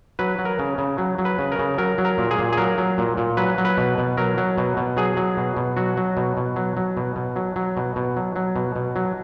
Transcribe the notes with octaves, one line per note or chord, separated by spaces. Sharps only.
F#3 B4
F#3
A#4
C#3
C#3
F#3
F#3
B4
C#3
A#4
C#3
F#3 A#4
F#3
A#4
A#2
G#4
A#2
G#4
F#3 A#4
F#3
A#2
A#2
F#3 B4
F#3
B4
B2
B2
F#3 A#4
F#3
B2
B2
F#3 G#4
F#3
B2
B2
F#3 F#4
F#3
B2
B2
F#3
F#3
B2
B2
F#3
F#3
B2
B2
F#3
F#3
B2
B2
F#3